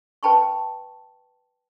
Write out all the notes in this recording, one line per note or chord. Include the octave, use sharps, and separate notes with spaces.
B4 G5 A5 B5 C#6